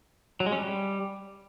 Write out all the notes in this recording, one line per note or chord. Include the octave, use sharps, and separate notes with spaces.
F#3
G#3
C#4
G3